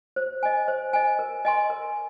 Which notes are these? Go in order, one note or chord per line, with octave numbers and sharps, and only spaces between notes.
C5
D#5 G#5
C5
D#5 G#5
A#4
D#5 G#5 C6
A#4